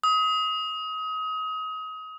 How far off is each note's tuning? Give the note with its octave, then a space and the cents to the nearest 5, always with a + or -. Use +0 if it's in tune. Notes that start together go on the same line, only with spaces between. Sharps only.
D#6 +30